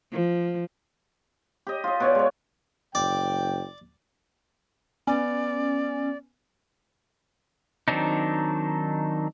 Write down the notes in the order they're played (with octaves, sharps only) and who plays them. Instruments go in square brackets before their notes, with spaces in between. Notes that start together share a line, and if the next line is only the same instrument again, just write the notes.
[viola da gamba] F3
[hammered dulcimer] G4 D#5
F4 D#5
B2 C#5 D5
G#3 C#5
[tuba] F#1 [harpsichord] D5 [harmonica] G5
[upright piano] B3 [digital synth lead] C#4 [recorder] D5
[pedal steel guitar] D#3 F#3 C4 D4 D#4